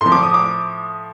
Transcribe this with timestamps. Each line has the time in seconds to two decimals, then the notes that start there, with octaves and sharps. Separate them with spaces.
0.01 A2 C6
0.06 F3
0.12 D6
0.23 D#6
0.34 D6